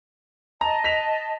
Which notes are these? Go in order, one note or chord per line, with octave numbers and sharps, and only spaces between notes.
D#5 A5 A#5
B6 F7